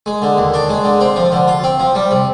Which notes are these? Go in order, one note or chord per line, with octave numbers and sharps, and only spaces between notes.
G#3
D3
D#2
D4
G#3
D3
C4
F3
D3
F4
C4
F3
G3
C3